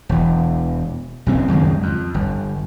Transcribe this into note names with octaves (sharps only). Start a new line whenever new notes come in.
E1 E2
B1 C#3 C4
C#2 F#2 D#3 G#3
F2
G1